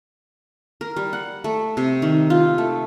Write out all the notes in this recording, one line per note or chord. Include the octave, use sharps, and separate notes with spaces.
A#4
G3
F#5
A3
C3
D#3
F4
A3